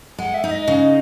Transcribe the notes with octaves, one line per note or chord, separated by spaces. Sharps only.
G#3 F#5
E5
D#4
D#5
C#3